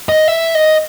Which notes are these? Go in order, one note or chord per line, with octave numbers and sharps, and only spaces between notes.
D#5
E5
D#5